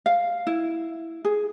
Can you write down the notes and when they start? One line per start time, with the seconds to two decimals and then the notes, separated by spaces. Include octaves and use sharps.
0.06 F5
0.47 E4
1.25 G#4